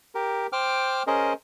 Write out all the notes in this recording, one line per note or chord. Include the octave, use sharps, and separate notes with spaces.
G4 A#4
C5 G5 D6 F6
C#4 G#4 A#4 C5 D#5